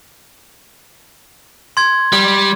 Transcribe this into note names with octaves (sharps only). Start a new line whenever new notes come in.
C6 G#6
G3